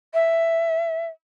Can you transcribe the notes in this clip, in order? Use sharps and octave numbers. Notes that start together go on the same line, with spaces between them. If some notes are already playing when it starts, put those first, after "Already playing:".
E5